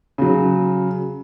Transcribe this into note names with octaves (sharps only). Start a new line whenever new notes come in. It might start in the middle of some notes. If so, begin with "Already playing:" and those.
C#3 F#3